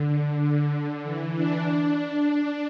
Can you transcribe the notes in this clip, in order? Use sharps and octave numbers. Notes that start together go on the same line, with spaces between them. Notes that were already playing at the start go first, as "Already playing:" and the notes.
Already playing: D3
D3
E3
D4
D4